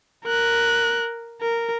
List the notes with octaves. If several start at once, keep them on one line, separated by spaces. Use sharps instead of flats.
A#4 F#6
A#4